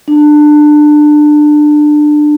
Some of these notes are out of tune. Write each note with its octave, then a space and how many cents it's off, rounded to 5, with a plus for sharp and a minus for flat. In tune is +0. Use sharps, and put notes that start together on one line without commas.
D4 +25